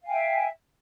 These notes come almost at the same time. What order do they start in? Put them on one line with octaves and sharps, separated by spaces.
F5 G#5 G5 E5